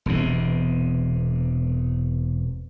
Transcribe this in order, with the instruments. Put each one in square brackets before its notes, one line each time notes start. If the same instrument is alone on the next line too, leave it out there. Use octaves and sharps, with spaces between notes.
[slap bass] E1 E2 C3